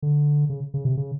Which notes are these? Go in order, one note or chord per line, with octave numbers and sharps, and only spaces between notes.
D3
C#3
C#3
C3
C#3